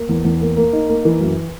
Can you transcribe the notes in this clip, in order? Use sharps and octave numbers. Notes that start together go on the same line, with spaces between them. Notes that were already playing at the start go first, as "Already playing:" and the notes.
Already playing: A#3
E2
E2
A#3
A#3
D#4
A#3
E3
F#2